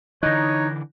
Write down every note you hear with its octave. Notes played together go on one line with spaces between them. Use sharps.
D3 E3 D#4 C#5 F#6 G6 A#6